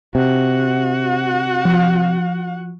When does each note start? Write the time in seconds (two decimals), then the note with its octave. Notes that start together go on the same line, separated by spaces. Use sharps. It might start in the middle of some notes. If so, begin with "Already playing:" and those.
0.15 C3 F#4 F#5
1.65 F3